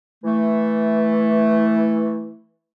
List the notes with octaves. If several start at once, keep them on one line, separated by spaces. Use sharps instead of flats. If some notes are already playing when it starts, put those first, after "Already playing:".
E3 A3